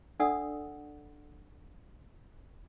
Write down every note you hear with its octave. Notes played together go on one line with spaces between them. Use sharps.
D4 A4 D5 F#5 D#6 E6